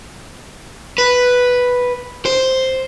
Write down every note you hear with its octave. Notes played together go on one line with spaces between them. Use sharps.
B4
C5